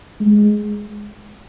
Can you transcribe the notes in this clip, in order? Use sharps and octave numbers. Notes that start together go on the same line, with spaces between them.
G#3